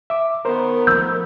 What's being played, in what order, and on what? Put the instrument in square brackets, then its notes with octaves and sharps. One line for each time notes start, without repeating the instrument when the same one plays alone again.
[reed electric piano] E5 D6
[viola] D#3 B3 [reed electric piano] A#4 C5
[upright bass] F3 A3 [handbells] E6 G6